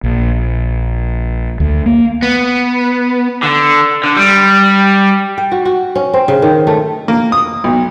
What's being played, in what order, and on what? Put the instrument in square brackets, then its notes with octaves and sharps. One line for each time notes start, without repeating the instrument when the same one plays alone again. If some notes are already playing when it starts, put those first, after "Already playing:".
[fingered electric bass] A#1
D2
A#3
[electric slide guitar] B3
[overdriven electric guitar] D3
D3
G3
[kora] G5
F#4
F#4
C#4
C4
C#3
D#3
A3
[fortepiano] A#3
D#6
B1